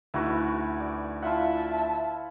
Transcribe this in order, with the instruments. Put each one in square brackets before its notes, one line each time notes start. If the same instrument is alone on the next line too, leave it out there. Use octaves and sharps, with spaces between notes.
[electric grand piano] D2 D#4 [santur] E4 F#4 B4
[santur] D5
[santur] E4 F4 F#5 [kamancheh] E5 A5